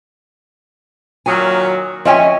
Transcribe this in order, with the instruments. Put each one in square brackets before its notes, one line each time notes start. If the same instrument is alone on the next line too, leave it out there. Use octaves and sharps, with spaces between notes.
[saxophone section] A#2 D#3 F#3 [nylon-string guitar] G#5
[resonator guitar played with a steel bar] F3 G#5 [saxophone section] C#4 [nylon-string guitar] D#5 E5 G5